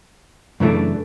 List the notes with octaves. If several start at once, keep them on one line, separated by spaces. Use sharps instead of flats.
F#2 C#3 E3 A3 D4